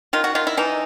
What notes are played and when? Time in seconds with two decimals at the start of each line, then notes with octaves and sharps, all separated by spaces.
0.13 D#3 F4
0.24 F#4
0.35 D#3 F4
0.47 E4
0.57 E3 D#4